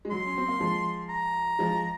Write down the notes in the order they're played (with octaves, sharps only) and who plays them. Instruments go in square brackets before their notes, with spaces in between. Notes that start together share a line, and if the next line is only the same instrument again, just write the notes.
[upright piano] G#3
[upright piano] F#3 [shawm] C6
[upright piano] C#4
C4
A#3
F3 G#3
[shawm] A#5
[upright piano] F3 G#3